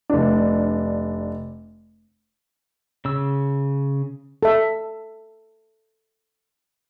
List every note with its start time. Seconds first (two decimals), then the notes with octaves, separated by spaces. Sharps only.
0.10 F1 D4
3.05 C#3 E6
4.43 A4 E5